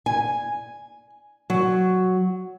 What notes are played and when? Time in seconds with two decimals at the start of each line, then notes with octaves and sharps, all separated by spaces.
0.06 G#5
1.50 F#3